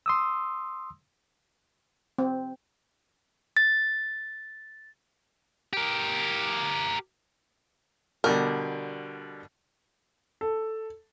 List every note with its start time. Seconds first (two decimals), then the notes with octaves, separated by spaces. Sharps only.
0.06 C6 D#6 E6
2.18 C4
3.57 A6
5.73 G4 A#4
8.24 B2 D3 G3 A#4
10.41 A4